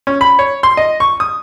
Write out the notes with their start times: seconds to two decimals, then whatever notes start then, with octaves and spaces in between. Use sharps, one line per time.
0.07 C#4
0.21 B5
0.39 C#5
0.63 C6
0.77 D#5
1.00 C#6
1.20 D#6